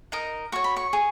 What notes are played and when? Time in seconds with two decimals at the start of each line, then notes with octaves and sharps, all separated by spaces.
0.12 D#4 A#4 D#5
0.52 F#4 C#5 C#6
0.64 B5
0.77 C#6
0.93 G#4